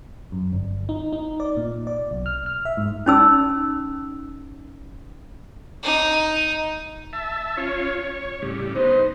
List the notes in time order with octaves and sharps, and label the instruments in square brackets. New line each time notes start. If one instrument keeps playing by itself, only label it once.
[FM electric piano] F#2
G1
D#4
D#4
D5
A#2
D5
B1
F6
F6
E5
G#2
[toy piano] C#4 D#4 E6
[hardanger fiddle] D#4
[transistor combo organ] E5 A5
C#4 F4 C#5
C#5
A2 C#3 G3
[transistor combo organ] B3 D#4 [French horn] C5